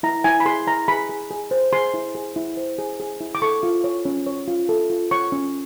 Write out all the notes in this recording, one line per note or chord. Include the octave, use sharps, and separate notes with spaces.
E4 A#5
E4 G#5
B5
G#4 C6
E4 A#5
G#4 B5
G#4
G#4
C5
G#4 C6
E4
G#4
E4
C5
G#4
G#4
E4
D6
A4 C#6
F4
C#5
C#4
C#5
F4
A4
F4
C#5 C#6
C#4